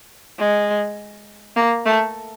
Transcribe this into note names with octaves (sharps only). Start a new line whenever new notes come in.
G#3
A#3
A3